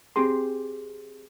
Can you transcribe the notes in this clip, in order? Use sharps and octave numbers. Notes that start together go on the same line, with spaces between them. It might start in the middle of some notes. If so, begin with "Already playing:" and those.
C4 G4 G#4 C6